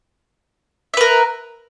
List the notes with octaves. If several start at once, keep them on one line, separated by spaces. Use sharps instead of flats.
A#4 B4 E5